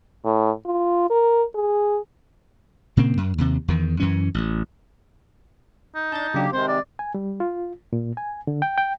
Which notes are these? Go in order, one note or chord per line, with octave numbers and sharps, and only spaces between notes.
A2
F4
A#4
G#4
A#2 C#3 A#3 C4
F#2
D#2 C3
E2 D#3
F#2 E3 C#4
A1
D#4
D4 A5 G6 A6
C#3 F#3 A#3 D4 G4
C3 D#3 G#3 C4 C5
D5
G#5
G3
F4
A#2
G#5
D3
G5
G5